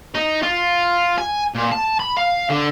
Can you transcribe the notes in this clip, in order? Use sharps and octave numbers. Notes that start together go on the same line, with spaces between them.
D#4
F4
G#5
A#2
A5
B5
F5
D3